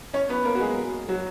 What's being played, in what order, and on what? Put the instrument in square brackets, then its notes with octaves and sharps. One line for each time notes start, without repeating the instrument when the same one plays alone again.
[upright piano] C#4 C#5
B3 B4
A#3 A#4
F#4
G#3 G#4
F#3 F#4